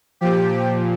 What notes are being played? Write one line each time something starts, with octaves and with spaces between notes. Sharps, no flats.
A#2 F3 G4